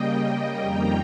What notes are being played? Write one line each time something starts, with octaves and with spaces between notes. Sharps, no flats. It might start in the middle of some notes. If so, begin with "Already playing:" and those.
Already playing: C#3 G3 A#3 D#5 G5
F2 D#3 G3 A#3 G5 A#5